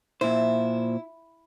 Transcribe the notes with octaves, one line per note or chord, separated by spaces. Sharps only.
A#2 E4 C5